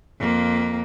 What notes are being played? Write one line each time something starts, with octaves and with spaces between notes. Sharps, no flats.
F2 A#3